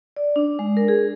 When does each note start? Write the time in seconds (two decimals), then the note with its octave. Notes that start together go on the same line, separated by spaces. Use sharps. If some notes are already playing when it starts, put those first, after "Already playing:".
0.16 D5
0.36 D4
0.59 G#3
0.77 A#4
0.88 G#4